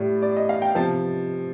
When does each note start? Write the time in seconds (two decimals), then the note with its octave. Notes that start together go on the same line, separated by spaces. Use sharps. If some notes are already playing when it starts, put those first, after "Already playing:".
Already playing: A2 G3 D5
0.22 D5
0.36 D#5
0.49 F5
0.62 G5
0.75 C3 F3 A5